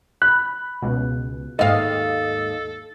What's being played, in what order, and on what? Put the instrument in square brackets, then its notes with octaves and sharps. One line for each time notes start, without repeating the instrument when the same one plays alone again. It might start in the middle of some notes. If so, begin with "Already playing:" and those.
[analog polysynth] B5 [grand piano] F#6
[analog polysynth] C#2 B2
[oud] D#2 F5 [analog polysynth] G#2 D#5 [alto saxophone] A4